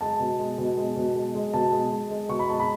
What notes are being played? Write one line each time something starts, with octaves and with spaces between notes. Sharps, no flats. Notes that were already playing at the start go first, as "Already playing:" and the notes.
G#3 A5
B2
G#3
B2
G#3
B2
G#3
G#3
B2 A5
G#3
G#3
G#3
B2 C#6
B5
G#3 A5
B5